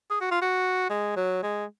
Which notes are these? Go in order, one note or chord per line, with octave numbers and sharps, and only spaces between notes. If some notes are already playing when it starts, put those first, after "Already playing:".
G#4
F#4
F4
F#4
G#3
F#3
G#3